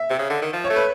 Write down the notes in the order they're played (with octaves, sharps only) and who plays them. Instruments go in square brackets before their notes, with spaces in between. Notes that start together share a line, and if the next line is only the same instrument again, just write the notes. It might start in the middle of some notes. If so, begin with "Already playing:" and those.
Already playing: [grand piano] E5
[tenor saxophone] C3
C#3
D3
D#3
F3
[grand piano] C#5
[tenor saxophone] A3
[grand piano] B4